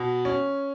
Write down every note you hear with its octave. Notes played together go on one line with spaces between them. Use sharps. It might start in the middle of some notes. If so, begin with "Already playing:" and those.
Already playing: B2
C#4